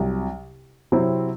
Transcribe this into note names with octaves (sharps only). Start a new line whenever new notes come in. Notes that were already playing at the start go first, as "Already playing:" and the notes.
Already playing: C2 C3 F#3
C3 F#3 C4 E4 C5